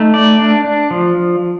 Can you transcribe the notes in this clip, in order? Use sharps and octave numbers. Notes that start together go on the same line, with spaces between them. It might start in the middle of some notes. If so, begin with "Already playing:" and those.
Already playing: A3 D#4
D5
D4
D4
F3